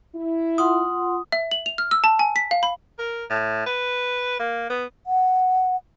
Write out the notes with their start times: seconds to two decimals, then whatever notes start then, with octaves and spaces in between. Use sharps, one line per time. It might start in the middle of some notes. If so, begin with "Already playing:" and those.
0.15 E4
0.58 F4 F#5 C6 D#6
1.32 E5
1.51 F#7
1.66 F7
1.78 F6
1.91 E6
2.04 A5
2.19 G#5
2.36 B6
2.51 F5
2.63 B5
2.99 A#4
3.30 A2
3.66 B4
4.40 A#3
4.70 B3
5.07 F#5